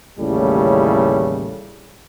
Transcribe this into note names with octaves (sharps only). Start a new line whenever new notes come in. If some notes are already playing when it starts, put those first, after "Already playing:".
A1 D#2 A2 C#3 G3 A4